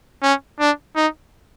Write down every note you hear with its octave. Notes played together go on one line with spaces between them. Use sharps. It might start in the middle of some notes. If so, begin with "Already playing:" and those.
C#4
D4
D#4